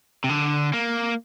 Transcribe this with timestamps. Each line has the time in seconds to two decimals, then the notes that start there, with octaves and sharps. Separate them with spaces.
0.24 C3
0.29 D3
0.73 A#3